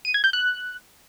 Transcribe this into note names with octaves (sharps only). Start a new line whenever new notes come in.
D#7
G#6
G6
F#6